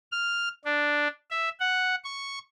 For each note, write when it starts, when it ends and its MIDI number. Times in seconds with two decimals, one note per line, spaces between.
0.12 0.49 89
0.65 1.08 62
1.31 1.49 76
1.60 1.95 78
2.04 2.39 85